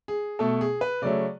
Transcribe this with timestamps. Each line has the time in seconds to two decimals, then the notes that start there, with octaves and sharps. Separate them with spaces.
0.08 G#4
0.39 B2 A3 A4
0.61 G#4
0.81 B4
1.02 C#3 F#3 A3 D5